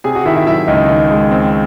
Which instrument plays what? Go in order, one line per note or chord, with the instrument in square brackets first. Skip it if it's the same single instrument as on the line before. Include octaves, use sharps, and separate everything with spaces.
[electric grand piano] C3 [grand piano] G#4 G#5
[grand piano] F#4 F#5
[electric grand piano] D#3 [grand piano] E4 E5
[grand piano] E4 E5
[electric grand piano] F#3 [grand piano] E4 E5
[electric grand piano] C#2 [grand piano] D#4 D#5
[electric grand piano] D#3
G#3
C4